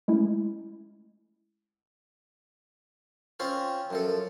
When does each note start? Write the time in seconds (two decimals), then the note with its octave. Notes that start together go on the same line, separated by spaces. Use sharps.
0.08 G#3 A3 C#4 E4
3.40 C4 C#4 F4 C5
3.90 F#2 F3 A4